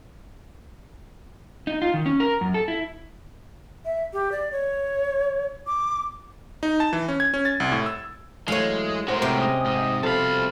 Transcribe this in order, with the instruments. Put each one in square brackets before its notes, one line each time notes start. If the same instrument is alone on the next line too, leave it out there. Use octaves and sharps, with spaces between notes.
[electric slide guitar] D#4
F4
D#3
C#4
A#4
F#2
A4
E4
[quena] E5
G4
D5
C#5
D6
[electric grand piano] D#4
A5
E3
C#4
G#6
C#4
A6
C2
A2
E6
[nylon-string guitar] E3 F#3 A3 [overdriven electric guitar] G#3 [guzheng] C#5 F5
[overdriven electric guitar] A2 G#3 [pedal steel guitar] F#4 A#4 [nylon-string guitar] C5
[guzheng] C3
[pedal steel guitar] C#4 D#5
[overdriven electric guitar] G#2 [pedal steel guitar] D#5
[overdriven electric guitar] C2 B5 [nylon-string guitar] B2 F3 A4 [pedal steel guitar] F5 A5